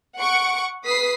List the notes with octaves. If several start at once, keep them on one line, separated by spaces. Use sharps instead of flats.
F#5 C#6 D7
B4 D#6 B6 C7